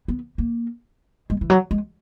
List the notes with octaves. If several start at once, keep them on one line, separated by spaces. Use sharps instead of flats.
B3
A#3
G#3
E3
F#3
G#3